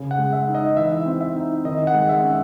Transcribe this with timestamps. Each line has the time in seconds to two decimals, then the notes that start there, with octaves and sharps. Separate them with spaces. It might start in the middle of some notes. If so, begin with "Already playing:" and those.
Already playing: C#3
0.11 F#5
0.18 G#3
0.33 E5
0.48 D#4
0.55 D#5
0.77 E3 E5
1.06 C4
1.21 E5
1.36 D#4
1.65 D#3 D#5
1.87 F#5
1.94 G#3
2.09 E5
2.23 C#4